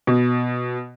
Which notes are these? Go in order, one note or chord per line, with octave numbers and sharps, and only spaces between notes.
B2